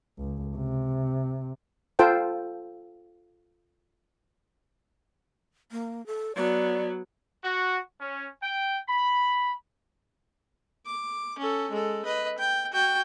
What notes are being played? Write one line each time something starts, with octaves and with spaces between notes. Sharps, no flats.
C#2
C3
F4 A4 C5 G5 A5
A#3
A4
F#3 B3 D5
F#4
C#4
G5
B5
D6
C#4 A4
G#3 A4
B4 D#5
G5
F#4 G5